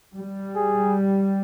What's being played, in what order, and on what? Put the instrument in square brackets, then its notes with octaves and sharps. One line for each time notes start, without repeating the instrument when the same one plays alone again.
[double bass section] G3
[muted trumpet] G#4